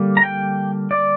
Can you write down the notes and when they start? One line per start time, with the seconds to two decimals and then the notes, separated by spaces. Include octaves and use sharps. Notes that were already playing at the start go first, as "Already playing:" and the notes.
Already playing: D3 G3 A#3
0.17 A#5
0.23 G5
0.91 D5